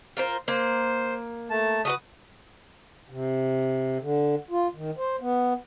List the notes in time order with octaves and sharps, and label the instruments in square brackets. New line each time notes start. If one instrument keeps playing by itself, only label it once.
[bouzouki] F4 A#4 C5
[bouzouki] A#3 [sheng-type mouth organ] C5
[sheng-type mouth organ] A3 A5
[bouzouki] A3 F#4 B4 [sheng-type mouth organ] D#6
[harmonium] C3
D3
F4
D#3
C5
B3